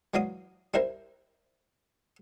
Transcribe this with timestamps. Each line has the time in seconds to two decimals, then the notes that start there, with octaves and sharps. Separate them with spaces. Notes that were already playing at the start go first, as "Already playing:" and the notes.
0.14 E3 F#3 D5 F5 C6 D#6
0.74 G3 E4 A#4 C5